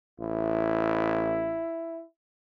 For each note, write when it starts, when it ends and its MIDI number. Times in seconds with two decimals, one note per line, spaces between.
0.20 1.64 33
0.20 2.04 64